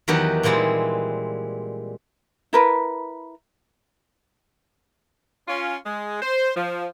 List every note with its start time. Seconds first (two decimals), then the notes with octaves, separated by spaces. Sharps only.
0.08 E2 D#3 F#3 G4 B4
0.43 A#2 E3 G3 G#3 C4
2.53 E4 A#4 B4
5.48 C#4 F4
5.86 G#3
6.22 C5
6.57 F3